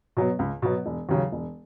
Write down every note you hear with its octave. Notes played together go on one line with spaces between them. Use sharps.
B2 F#3 B3
C#2
B2 F#3 B3
E1
D#2 C#3 F#3
E1